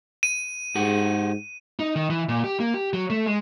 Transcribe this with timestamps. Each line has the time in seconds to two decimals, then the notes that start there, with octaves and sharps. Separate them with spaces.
0.23 D#7
0.75 G#2 G4 G#4 F#5
1.79 D#4
1.96 D#3
2.10 E3
2.29 A#2
2.44 G4
2.60 A#3
2.74 G4
2.93 F#3
3.10 A3
3.27 G#3